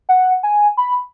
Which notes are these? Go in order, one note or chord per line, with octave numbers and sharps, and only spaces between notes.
F#5
G#5
B5